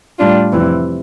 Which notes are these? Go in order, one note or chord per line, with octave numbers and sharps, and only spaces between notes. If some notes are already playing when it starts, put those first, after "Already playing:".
A2 G3 D4 F4
F2 C3 E3